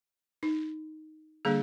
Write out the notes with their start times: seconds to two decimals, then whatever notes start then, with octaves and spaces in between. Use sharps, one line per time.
0.43 D#4
1.45 D3 G3 A#3 D4 G#4